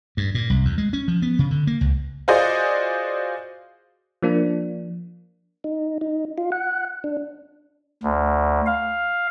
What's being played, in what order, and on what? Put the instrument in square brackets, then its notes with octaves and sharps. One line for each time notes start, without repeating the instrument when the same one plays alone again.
[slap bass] G2
A#2
C2
E2
G#3
C#4
F3
B3
C#3
D3
A#3
C#2
[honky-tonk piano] F4 F#4 G#4 C5 D5 D#5
[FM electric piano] F3 A#3 D4
[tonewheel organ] D#4
D#4
F4
F#5
D4
[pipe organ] D2
F5